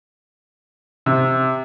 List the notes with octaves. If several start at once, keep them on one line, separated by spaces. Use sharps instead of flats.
C3